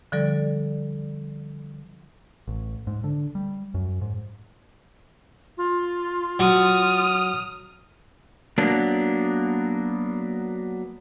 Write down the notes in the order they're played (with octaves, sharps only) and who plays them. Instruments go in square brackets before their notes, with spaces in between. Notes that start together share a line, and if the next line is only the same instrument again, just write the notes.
[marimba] D3 F3 G3 A4 D5
[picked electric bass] A1
G#2
D3
G3
F#2
G#2
[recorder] F4
[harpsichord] F#3 [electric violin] D#6 F6
[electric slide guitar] F#3 A#3 B3 D4